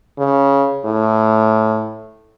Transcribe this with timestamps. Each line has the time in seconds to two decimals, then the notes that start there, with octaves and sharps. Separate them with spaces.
0.19 C#3
0.85 A2